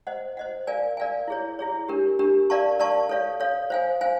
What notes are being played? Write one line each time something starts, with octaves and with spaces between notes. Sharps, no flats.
C5 D#5 F#5
C5 D#5 F#5
A#4 D5 F5 G#5
A#4 D5 F5 G#5
E4 G#4 C#5
E4 G#4 C#5
D4 G4 A#4
D4 G4 A#4
A#4 D5 F5 A5 C#6
A#4 D5 F5 A5 C#6
A4 C#5 F5
A4 C#5 F5
C5 F5 G#5
C5 F5 G#5